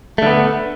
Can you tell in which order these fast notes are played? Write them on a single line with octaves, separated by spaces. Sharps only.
A3 D3 B3